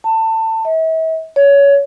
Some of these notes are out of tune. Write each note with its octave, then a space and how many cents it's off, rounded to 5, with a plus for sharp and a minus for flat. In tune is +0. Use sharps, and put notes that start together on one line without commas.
A5 +25
E5 -40
C#5 +20